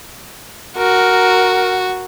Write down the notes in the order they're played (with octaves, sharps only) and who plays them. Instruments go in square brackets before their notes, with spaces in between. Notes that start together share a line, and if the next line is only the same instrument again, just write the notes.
[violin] F#4 [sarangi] A#4